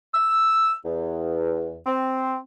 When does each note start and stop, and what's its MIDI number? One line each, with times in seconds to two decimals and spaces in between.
0.14 0.74 88
0.85 1.78 40
1.87 2.39 60